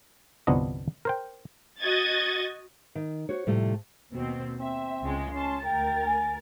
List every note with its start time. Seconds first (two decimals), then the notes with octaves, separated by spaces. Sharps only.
0.47 G1 C2 F3 B3 D4 D#5
1.05 A#4 C5 G5
1.79 F#4 D#5 G#6 A6
2.95 D#3
3.29 F#4 C5 C#5
3.47 A2 C3 F3 G3 A3
4.13 D#2 B2 C4
4.60 C4 E5
5.02 C#2 C#3 G#3
5.34 C#4 A5 C6
5.65 D2 A#4 G5 A6
6.06 G#5